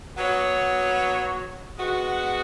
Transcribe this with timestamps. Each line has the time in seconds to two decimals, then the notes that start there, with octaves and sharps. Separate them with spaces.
0.17 F#3 B3 F#4 C#5
1.76 G#3 B3 F#4